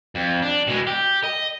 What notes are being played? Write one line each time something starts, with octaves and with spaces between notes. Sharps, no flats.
F2
D4
B2 G#3
G4
D#5